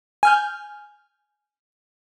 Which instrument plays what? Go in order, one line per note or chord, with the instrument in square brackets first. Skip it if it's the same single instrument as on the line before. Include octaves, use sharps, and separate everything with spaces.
[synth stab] G#5 F6 G6